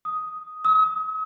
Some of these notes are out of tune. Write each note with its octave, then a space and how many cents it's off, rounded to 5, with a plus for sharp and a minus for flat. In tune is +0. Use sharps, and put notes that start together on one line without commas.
D#6 +5
D#6 +45